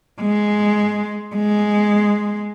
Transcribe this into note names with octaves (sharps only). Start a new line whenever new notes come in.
G#3
G#3